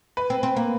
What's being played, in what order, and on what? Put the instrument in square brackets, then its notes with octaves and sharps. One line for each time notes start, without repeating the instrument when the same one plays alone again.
[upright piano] B4
[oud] C4
C4
A#3